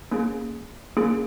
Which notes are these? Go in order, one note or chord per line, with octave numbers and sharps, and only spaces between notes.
A#3 C#4 G#4
A#3 C#4 G#4